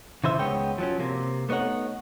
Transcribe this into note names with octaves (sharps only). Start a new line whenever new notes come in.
C#3 E3 C5 E5
C#2 G#3 B3 C#5 G5
F3 F#3 C#4
C3 A#3
A3 B3 D#4 C#5 F#5